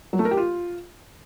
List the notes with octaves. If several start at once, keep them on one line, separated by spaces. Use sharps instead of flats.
F#3
A3
A#4
G4
F4